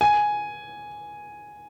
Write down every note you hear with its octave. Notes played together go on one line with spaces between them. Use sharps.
G#5